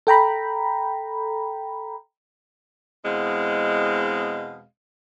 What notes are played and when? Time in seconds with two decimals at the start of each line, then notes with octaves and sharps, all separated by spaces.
0.07 A4 G5 A#5 B5
3.05 E2 B2 G#3 C4 D#5 F5